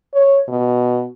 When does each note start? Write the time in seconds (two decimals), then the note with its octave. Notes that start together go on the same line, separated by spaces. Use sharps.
0.14 C#5
0.48 B2